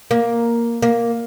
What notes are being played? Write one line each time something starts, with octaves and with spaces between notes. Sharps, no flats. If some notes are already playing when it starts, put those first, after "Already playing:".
A#3
A#3